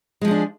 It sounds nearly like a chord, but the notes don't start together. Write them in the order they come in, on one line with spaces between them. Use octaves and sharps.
G#3 F3 G#4 D4